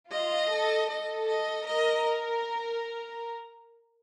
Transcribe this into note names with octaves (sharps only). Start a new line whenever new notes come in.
F4 D#5
A4
A4 D#5
D#5
A#4 D#5